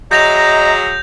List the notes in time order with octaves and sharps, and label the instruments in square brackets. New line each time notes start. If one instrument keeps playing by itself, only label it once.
[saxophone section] F#3 G#4 E5 [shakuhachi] D#5 [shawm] A#5 [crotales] G6 A#6 F7